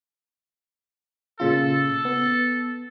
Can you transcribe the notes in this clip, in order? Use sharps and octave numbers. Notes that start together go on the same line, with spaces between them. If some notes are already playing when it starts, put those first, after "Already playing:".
A#2 C#3 F4 A4
B3